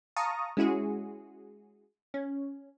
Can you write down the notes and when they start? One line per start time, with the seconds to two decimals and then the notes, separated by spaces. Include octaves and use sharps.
0.16 F5 A5 A#5 C#6 D#6
0.57 G#3 C#4 E4 F#4 G#4
2.14 C#4